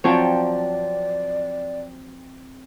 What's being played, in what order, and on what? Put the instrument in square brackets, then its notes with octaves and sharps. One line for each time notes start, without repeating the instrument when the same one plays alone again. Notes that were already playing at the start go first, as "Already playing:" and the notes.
[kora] F3 F#3 C#5 [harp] C4 G5 A5 [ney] D5